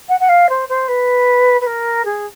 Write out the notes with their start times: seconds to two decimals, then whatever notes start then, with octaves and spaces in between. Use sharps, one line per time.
0.09 F#5
0.20 F#5
0.29 F5
0.49 C5
0.69 C5
0.88 B4
1.61 B4
1.66 A#4
2.05 G#4